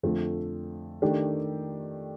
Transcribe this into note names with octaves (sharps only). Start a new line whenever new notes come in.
F2 D3 A3
D#3 A3 D4 G4